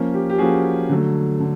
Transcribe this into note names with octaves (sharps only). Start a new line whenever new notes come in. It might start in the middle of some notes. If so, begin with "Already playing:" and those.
Already playing: F3 A#3 C#4
G4
G4
F3 A#3 C#4 F#4 G#4
D3 F#3 A3
D3